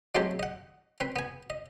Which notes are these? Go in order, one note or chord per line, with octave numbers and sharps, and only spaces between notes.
F#3 G#3 A3 C4 E4 G4
D#5 F#5
C4 B4
B3 G#5
D#5